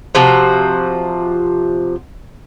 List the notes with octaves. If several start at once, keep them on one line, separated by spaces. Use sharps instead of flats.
C3 F3 F#4